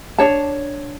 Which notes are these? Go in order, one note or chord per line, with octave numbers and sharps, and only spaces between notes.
D4 C#5 A5